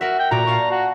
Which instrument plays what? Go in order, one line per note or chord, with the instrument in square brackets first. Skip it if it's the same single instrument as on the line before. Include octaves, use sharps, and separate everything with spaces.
[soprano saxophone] F#4 [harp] A#4 E5
[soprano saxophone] G5
[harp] A#2 F#4 D5 [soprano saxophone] A#5
[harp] F5 A5 C#6
[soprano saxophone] F#4